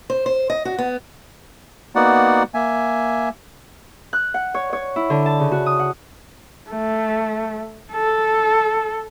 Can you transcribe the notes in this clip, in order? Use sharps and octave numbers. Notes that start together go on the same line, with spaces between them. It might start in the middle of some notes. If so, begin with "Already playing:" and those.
C5
C5
D#5
F#4
B3
A#3 B3 D#4 F#4 D5 F#5
A#3 E5 G#5
F#6
F#5
C#5
C#5
E4
D3
A5
C#3
F#4
D#6
F#5
A3
A4